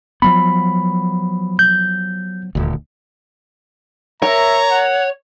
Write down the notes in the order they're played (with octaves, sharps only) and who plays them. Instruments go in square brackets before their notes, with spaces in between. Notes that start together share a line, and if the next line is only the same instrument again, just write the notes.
[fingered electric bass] F3 F#3 B3 [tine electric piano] B5
[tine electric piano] G6
[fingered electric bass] D#1 D2
[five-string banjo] A#4 [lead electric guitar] C#5 [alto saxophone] E5 [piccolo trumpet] A#5
[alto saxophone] F#5